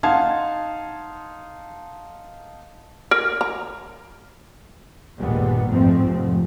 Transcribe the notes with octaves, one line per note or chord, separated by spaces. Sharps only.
D#4 F5 F#5 A5 C6 G#6
A#4
A#5
G1 D#2 A#2 G3 G#3 B3
A1 F2 G#2 F3 A3 C4
F1 F3